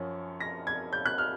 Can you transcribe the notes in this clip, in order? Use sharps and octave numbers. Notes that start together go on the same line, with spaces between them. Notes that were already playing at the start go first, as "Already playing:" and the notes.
Already playing: F#2 F3 C#4
A#6
G#6
G6
F#6
F6